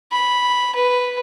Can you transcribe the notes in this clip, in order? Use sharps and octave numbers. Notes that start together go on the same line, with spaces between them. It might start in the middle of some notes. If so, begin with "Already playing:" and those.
B5
B4